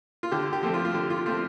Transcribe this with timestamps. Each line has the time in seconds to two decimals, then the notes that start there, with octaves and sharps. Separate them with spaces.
0.23 F4
0.32 D3 G4
0.53 G4
0.63 F3 A3 C4
0.74 F4
0.85 F4
0.94 D3 G4
1.10 F4
1.26 F3 A3 C4 F4